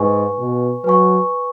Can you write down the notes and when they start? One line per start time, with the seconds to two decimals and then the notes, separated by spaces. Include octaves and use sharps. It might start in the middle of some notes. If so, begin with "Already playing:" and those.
Already playing: G#2 B4 G#5 C#6
0.38 B2
0.84 F#3 B4 G#5 C#6